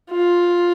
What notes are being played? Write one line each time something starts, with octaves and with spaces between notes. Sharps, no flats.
F4